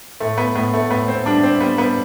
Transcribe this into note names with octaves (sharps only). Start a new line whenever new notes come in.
A2 A3
B3
A2 B3
A3
A2 B3
C4
G3 D4
C4
G3 B3
B3